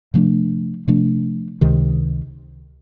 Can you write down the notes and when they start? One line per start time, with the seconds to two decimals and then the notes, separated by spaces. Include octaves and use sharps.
0.14 C3 F3 A3 D4
0.88 C3 F3 A3 D4
1.61 C#2 C3 D#3